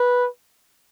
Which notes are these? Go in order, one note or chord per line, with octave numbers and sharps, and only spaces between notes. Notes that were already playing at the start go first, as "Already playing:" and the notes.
Already playing: B4